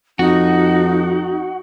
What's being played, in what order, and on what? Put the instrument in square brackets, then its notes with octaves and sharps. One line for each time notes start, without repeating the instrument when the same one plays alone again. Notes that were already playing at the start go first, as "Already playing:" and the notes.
[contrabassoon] F2 [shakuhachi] D#4 [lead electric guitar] F#4